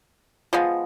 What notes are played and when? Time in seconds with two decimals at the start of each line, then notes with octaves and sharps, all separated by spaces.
0.53 F3 G#3 B3